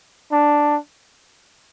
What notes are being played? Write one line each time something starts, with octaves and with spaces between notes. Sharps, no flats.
D4